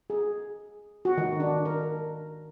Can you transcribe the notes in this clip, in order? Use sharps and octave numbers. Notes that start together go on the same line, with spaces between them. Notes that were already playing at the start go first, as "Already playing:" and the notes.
G#4
F#4
D#3
D4
A#4